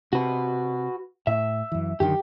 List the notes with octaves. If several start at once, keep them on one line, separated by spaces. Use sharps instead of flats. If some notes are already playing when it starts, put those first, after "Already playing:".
C3 F#4 B4
A2 E5
F#2 E3
F#2 D3 D#3 G4